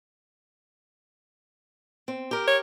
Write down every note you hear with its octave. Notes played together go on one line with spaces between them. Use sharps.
C4
G4 A#4
C#5